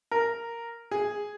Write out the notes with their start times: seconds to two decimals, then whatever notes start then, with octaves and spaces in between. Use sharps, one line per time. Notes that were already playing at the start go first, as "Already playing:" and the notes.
0.11 A#4
0.91 G#4